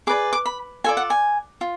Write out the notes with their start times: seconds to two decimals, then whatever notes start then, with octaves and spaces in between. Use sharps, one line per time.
0.07 G#4 B4 D5 D6
0.33 D6
0.46 B5
0.84 F4 A4 D5 G#5
0.97 F#5
1.10 G#5
1.61 F4